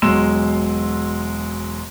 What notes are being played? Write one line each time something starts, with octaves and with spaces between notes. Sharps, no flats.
E1 F#3 G#3 C6 E6 E7